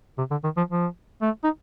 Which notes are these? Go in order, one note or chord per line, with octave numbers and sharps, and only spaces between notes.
C3
D3
D#3
F3
F3
A3
D#4